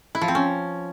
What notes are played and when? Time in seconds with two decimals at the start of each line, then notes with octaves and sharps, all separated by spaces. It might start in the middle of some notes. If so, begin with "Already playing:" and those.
0.15 E4
0.21 F3
0.28 C4
0.35 C#4